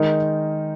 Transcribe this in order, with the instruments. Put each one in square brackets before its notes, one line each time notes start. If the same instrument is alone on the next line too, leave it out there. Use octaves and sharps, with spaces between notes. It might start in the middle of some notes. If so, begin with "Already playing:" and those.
Already playing: [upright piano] D#3 G#3 D#4 A#4